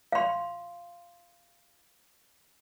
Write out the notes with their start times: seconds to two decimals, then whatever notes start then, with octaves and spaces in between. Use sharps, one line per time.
0.12 F5 C6